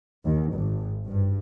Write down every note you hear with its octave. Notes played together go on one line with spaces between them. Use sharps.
D#2
G#1
G2